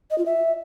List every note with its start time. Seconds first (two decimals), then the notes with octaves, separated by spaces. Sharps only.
0.11 D#5
0.18 F4
0.26 E5